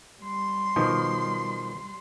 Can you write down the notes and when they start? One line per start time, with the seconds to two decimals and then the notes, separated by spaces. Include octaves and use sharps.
0.20 G3 C6
0.76 B2 D#3 F3